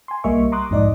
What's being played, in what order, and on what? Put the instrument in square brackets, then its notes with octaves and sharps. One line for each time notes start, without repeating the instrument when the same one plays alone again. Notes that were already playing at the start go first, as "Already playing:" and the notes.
[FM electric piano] G#5 C6
B1 G3 A#3 D#5 E5 C#6
A#5 C6 D6 D#6 F#6
B1 F2 G#2 D#4 D5 D#5